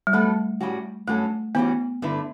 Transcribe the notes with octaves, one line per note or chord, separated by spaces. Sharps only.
G3
G2 F#3 A3 B3 F#4 A4
A2 G3 C#4 F#4
G2 F#3 A3 C#4 F#4 A4
E3 G3 B3 C#4 F#4
G2 D3 A3 E4 B4